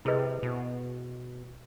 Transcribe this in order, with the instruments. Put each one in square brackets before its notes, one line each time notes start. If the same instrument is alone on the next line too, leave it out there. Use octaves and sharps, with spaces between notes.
[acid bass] C3 [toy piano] E4 G#4 B4 D#5
[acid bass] B2